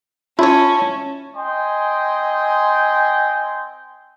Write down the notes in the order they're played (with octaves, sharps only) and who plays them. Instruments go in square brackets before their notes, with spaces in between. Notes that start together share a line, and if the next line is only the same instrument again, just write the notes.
[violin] C#4 [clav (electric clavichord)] E4 C#5 [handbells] F4 [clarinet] A5
[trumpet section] C4 D#5 G5 G#5 C6